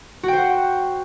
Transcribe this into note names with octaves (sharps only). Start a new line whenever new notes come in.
F#4 C5 F#5 G5